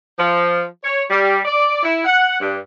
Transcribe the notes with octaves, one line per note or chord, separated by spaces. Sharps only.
F3
C#5
G3
D5
E4
F#5
G2